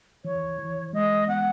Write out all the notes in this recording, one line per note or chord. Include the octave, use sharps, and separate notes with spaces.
E3 C#5
E3
G#3 D#5
B3 F#5